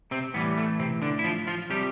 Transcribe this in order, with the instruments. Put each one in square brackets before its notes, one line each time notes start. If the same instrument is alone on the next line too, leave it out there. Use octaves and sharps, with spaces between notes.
[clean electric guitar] C3 C4
A2 E3 G3 B3
A3
C3 C4
D3 D4
E4
F3 F4
F3 F4
C3 F3 G3 G4